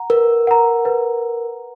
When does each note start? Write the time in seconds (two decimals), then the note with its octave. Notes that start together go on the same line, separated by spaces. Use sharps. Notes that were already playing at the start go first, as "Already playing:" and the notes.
Already playing: F#5 A#5
0.10 A#4 B4
0.47 F#5 A#5
0.85 B4